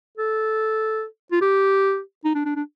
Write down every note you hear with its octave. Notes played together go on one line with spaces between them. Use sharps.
A4
F4
G4
D#4
D4
D4
D4